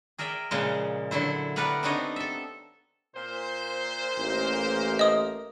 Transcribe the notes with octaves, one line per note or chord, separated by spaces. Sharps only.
G#4 A#4 D5 E5 G5
A#2 C#3 F3 G#3
D3 F#3 E4 C5
B3 G4 A#4 B4 D5 F#5
B3 C4 D4 D#4 C#5 D#5
A4 E5
A#2 C5
A1 A#3 A#4
D#5 D#6